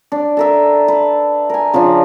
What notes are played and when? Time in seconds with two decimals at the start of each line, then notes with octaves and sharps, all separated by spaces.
0.12 D4
0.37 A4 A#4 E5
0.88 B4
1.49 A#4 G#5
1.73 C#3 F3 C#4 D4